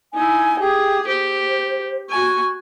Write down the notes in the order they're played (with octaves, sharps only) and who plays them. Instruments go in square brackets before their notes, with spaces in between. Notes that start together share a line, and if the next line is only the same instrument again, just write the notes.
[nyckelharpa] D#4 E4 [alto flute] G#5
[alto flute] G4 [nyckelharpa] G#4
[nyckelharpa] G4 [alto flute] C5
[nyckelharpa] F#4 G#5 [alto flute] C#6